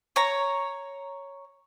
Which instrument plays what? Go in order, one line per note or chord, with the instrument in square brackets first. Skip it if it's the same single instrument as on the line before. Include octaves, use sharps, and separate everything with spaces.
[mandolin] C#5 A#5